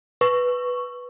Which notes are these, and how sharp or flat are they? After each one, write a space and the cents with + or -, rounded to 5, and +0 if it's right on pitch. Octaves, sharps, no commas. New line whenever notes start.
B4 +0 C#6 +0